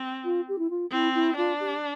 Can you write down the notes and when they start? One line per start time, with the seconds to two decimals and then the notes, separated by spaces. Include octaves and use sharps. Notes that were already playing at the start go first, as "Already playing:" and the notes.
Already playing: C4
0.24 F4
0.48 G4
0.59 E4
0.70 F4
0.92 C4 E4
1.14 E4
1.37 D4 F4
1.59 G4